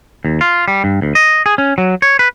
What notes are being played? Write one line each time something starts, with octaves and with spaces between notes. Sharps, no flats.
D#2
F4
G3
G2
D2
D#5
G#4
C#4
F#3
C#5
B4